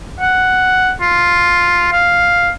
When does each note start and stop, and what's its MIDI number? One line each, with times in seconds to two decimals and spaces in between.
0.20 0.91 78
1.01 1.88 65
1.92 2.50 77